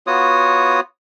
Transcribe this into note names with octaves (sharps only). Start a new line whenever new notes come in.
B3 F4 F#4 C#5 D#6